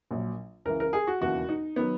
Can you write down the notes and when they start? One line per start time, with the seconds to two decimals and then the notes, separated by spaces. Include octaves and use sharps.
0.11 A#1 A#2 F#3
0.65 C#2 C#3 E3 A#4
0.80 A#4
0.93 G#4
1.07 F#4
1.21 E1 D#2 C#3 E3 F#4
1.49 D#4
1.76 D#3 F#3 B3